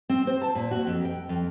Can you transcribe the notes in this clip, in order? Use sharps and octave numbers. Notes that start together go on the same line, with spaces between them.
C4
C5
A5
A#2
F#4
F2
G5
F2